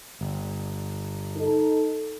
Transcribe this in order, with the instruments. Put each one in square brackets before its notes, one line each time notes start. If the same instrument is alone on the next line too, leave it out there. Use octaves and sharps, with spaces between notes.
[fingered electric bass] G1
[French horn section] D#4 A4